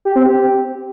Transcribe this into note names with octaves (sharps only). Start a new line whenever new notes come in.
G4
C4
G4